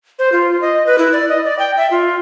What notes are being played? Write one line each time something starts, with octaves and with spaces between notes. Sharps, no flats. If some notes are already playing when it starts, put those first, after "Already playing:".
C5
F4
D#5
B4
E4
D5
D#5
D5
G5
E5
F4